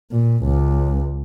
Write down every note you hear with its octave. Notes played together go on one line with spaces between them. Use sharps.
A#2
C#2